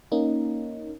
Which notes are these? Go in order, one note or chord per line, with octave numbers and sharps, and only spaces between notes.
A#3 C#4 D#4